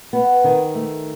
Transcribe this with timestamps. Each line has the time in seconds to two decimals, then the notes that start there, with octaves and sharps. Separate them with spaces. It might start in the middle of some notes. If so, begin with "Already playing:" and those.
0.13 B3
0.44 D#3
0.75 A3